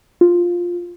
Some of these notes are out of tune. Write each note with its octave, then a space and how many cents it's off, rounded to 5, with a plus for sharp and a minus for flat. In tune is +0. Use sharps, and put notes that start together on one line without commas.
F4 +5